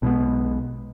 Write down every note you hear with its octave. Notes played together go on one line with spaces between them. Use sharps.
B1 B2 G#3 B3